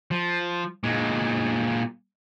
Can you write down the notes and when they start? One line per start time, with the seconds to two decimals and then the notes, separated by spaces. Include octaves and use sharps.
0.11 F3
0.84 A#2 G#3